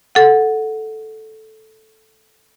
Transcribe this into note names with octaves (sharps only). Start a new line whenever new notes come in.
A4 F#5